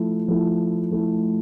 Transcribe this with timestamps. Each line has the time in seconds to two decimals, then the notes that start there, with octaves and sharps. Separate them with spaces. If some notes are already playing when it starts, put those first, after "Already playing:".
Already playing: F3 A3 E4
0.28 F3 A3 E4
0.91 F3 A3 E4